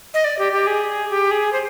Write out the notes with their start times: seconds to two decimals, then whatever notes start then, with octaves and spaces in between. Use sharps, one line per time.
0.14 D#5
0.24 D5
0.38 G4
0.52 G4
0.67 G#4
1.10 G4
1.31 G#4
1.53 C5